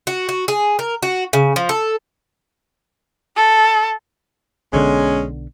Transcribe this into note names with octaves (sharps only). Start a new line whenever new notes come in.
F#4
F#4
G#4
A#4
F#4
C#3
F3
A4
A4
B1 D3 G#3 B3 C#4